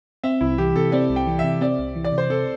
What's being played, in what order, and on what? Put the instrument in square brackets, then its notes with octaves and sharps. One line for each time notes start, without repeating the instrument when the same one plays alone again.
[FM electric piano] C4 [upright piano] E5
[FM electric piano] C2 [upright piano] E4
[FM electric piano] E3 [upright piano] G4
[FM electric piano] C3 [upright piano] A4
[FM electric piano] C4 [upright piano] D5
[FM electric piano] C2
[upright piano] G5
[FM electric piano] E3
[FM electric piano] C3 [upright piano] E5
[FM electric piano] C4 [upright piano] D5
[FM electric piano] C2
E3
[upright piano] D5
[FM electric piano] C3
[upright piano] C5
[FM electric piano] C4 [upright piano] A4